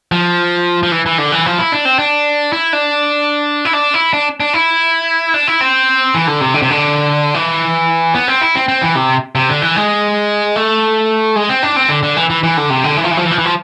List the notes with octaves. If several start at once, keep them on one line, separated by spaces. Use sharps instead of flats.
F3
F3
E3
E3
D3
E3
F3
E4
D4
C4
D4
E4
D4
E4
D4
E4
D4
D4
E4
D4
E4
C4
E3
D3
C3
D3
C3
D3
E3
B3
C4
E4
C4
C4
E3
C3
C3
D3
E3
G#3
A3
G#3
C4
D4
C4
D3
D3
E3
E3
E3
D3
C3
D3
E3
F3
E3
F3
E3
F3
E3
F3